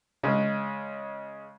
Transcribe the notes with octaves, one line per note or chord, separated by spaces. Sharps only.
C#3 G#3